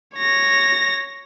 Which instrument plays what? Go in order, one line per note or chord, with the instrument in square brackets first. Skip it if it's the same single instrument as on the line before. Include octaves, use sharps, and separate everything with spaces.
[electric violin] C#5 A#6